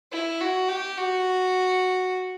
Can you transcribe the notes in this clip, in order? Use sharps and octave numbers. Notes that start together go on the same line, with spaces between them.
E4
F#4
G4
F#4